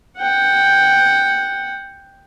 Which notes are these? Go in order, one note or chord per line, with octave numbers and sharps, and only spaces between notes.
F#5 G5